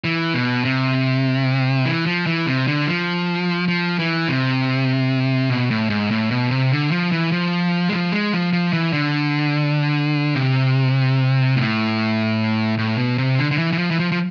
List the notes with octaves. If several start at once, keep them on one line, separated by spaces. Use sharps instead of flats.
E3
B2
C3
E3
F3
E3
C3
D3
F3
F3
E3
C3
B2
A2
G#2
A2
B2
C3
D3
F3
E3
F3
G#3
F3
G#3
F3
F3
E3
D3
C3
A2
A2
B2
C3
D3
D3
E3
E3
F3
E3
F3
F3